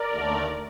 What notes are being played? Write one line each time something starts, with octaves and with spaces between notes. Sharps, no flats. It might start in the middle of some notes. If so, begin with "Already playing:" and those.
Already playing: A#4 D5
D#2 D3 A3